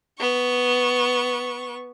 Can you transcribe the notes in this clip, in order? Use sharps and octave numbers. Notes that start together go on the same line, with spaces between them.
B3 C#6